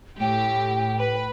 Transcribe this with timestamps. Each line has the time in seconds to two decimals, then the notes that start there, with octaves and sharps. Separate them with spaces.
0.20 A2 G4 G5
0.98 B4